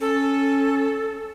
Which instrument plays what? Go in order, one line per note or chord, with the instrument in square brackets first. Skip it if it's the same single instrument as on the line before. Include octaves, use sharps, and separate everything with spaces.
[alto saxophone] C#4 [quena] A4